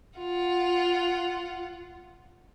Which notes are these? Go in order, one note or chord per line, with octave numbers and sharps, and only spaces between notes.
F4 F#5